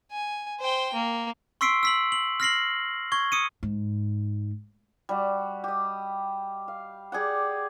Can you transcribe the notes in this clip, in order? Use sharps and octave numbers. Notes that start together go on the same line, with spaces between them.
G#5
C5 G5
A#3
C6 C#6 E6 B6 C7 D7
E6 B6 F#7
F#7
F6 A#6 C7 F#7
C#6 G#6 G7
D#6 C#7 D#7
G#2
G3 F#4
G4 D#5
F5
G4 G#4 D5 F#5